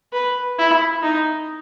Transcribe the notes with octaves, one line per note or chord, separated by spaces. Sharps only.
B4
E4
D#4